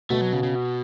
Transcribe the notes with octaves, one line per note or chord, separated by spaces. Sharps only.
B2 A3 B3 F#4
F#3
C#3
C#3
B2